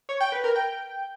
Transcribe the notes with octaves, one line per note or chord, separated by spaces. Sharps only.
C#5
G5
B4
A#4
G5